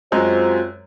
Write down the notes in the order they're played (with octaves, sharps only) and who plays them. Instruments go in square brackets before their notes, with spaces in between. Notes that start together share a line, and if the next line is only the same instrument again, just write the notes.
[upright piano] F#2 F#3 G#3 [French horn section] C4 F4 C5